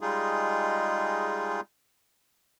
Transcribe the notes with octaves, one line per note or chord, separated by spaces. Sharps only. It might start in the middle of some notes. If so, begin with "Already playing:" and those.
G3 G#3 D#4 F4 G#4